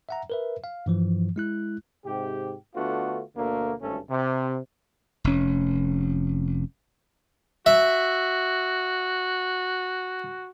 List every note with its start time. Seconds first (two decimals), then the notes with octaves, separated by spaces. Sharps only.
0.09 E5 F#5 A#5
0.30 A#4 B4 E5
0.64 F5
0.86 G2 E3 F3
1.36 G#3 E4 F#6
2.05 G#2 C3 G4
2.75 D3 A3 B3 D4 F4 F#4
3.36 D2 B2 D3 A3 A#3
3.81 G#1 D2 G2 A3 C#4 A4
4.09 C3
5.24 F1 C#4
7.66 F#4 E5